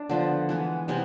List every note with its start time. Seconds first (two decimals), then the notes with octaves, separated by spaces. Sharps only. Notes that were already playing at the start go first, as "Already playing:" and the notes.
Already playing: D4
0.09 D3 F3 B3
0.49 E3 G#3 B3
0.88 C3 G#3 B3 E4